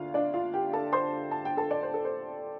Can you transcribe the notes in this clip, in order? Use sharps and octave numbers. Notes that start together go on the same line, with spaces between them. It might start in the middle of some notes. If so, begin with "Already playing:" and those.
Already playing: D2 D4 F4 F5
D4 D5
F4 F5
G4 G5
A4 A5
C5 C6
A5
G5
A4 A5
D5
C5
A4
C5